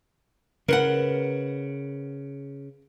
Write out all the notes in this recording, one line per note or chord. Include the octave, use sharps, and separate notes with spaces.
C#3 A#4 B4 F#5